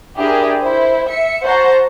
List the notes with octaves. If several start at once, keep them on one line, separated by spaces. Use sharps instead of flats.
D4 E4 G4 G#4 A#4
E4 C5
E5 C#7
F#4 C5 F#5 A5 A#5 C6